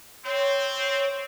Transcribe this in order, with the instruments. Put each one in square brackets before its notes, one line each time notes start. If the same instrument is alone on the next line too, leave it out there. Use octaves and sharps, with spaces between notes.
[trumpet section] C4 [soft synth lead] C#5